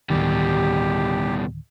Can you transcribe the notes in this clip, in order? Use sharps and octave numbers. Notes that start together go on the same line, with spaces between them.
D1 A#1 B2 D#3 G3 G4